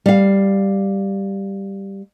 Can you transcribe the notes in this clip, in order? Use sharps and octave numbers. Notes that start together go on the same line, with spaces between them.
G3 F5